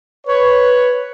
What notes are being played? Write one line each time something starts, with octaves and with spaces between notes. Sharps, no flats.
B4 C#5